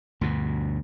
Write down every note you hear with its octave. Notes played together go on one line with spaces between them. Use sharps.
D2 G2 B2